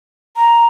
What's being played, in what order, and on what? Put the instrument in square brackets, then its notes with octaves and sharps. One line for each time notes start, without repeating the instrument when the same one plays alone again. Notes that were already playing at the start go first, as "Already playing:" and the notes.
[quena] A#5